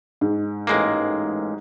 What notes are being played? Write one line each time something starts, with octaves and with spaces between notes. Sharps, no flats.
G#2
A1 G#3 A#3